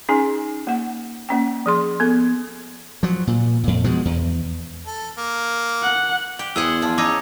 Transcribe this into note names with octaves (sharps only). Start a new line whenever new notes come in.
C#4 D#4 G#4 G#5
A#3 F#5
A#3 C#4 G5
F3 G#4 C6
B3 A4
F3 F#3
A#2
F2 A#2
B2 F3 G#3
E2
A4
A#3
F#5
G4
E2 G#4 C5 F#5 E6 G#6
F3
C#4 D#4 C#5 D6 E6 G#6